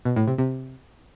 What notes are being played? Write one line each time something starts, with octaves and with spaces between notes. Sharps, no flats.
B2
A2
C3
C3